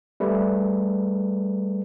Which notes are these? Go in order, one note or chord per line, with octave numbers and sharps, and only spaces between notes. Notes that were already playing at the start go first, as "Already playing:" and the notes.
G3 A3 B4